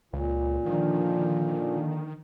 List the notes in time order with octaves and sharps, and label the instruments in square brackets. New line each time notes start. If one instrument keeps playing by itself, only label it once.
[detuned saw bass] C#2 [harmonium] A#2
[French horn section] D3 A#3 D4 [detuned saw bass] D#3 [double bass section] F3